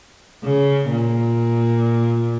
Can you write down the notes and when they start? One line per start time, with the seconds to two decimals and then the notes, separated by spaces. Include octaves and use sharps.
0.44 C#3
0.91 A#2